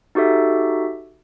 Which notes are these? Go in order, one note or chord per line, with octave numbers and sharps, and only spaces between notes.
D#4 F#4 G4 A4 E5